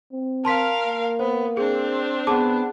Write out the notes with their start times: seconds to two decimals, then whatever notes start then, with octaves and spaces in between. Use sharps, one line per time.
0.12 C4
0.45 A#4 F5 A5 C6 B6
0.86 A#3
1.19 B3 C5
1.57 C4 D4 G#4
2.27 B3 G#4 A5 D6